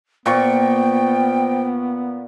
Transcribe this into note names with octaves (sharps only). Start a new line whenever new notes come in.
A#2 B3 C5 G5 C#6